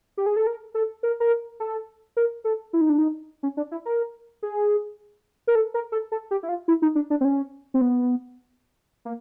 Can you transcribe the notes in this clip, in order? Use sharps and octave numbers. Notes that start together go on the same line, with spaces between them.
G4
G#4
A4
A#4
A4
A#4
A#4
A4
A#4
A4
E4
D#4
D4
D#4
C#4
D4
E4
A#4
G#4
A#4
A4
A#4
A4
A4
G4
E4
F4
E4
D#4
D4
D4
C4
C#4
C4
B3
A#3